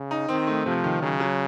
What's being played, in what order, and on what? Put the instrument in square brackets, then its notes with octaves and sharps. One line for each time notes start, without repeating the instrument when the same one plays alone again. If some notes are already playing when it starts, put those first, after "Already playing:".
Already playing: [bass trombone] C#3
[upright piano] D#4
[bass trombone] D#3 [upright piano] C4
[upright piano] A3
[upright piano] C3 [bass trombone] F3
[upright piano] D#3
[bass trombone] C#3 [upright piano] F#3
[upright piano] F#3